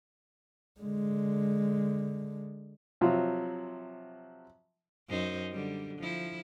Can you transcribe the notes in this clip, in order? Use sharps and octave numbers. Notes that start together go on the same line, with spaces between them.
D3 G#3
C3 F3 F#3
F#2 D#4 C5
D3 G3
F3 E4